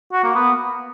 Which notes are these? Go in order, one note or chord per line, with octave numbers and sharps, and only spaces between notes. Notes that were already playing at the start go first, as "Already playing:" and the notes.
F#4
A#3
B3